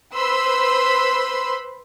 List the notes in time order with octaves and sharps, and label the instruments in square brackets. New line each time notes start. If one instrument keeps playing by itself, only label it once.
[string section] B4 C5 B5 C6 E6